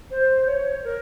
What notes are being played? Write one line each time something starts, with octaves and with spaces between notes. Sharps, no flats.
C5
C#5
A#4